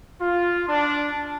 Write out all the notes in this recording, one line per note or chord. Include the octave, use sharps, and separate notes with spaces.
F4
D4